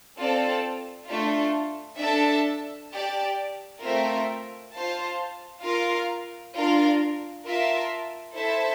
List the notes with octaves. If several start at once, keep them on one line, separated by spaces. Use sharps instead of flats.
C4 F4 A4 D5 A5
A3 D4 F4
D4 A4 E5 A5
G4 D5 A5
A3 C4 F4 A#4 E5
F4 C5 F5 A5
F4 A#4 F5
D4 F4 A#4 F5
F4 A#4 E5 A5
E4 A4 C5 E5 A5